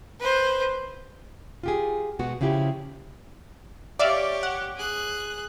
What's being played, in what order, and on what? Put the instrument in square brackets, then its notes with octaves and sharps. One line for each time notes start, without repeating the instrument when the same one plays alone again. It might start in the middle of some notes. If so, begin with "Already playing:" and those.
[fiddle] B4 C5
[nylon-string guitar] F4 G4 G#4
B2 G#3 B3 F#4
C#3 F3 E4 G4
[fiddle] G4 C#5 [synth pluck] D5 E5 F5
[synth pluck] F#5
[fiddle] G#4 F#6